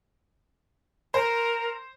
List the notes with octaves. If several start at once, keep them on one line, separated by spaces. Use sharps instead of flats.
A#4 C5